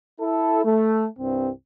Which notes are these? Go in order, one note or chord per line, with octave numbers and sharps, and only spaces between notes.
E4 A4
A3
C2 G2 C4